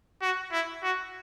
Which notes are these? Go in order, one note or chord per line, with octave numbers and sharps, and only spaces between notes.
F#4
E4
F#4